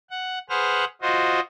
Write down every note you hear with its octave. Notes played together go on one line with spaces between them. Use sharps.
F#5
G#4 B4 C5 F#5 F6
F4 F#4 C5 D#5